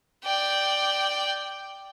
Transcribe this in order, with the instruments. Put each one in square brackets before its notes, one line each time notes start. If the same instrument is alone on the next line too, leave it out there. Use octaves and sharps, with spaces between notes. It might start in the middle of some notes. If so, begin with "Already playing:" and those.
[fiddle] D5 G5